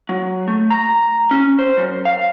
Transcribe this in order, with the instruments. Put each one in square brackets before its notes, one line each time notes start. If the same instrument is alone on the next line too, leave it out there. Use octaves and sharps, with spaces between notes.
[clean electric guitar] F#3
A3
A#5
C#4
C5
F#2
F5